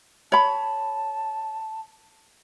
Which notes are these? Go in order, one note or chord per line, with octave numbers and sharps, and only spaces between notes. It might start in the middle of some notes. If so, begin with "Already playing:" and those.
C#5 A5 B5